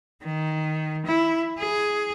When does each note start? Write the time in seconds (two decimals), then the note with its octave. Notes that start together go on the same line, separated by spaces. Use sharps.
0.23 D#3
1.06 E4
1.59 G#4